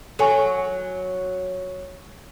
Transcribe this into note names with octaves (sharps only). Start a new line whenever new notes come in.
F#3 A4 G#5 C#6